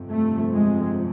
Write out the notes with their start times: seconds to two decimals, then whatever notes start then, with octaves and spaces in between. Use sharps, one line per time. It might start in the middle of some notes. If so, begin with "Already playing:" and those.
Already playing: G1 F2 C3
0.09 A3
0.53 G#3